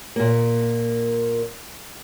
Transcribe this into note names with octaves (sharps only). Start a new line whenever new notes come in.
A#2 A#3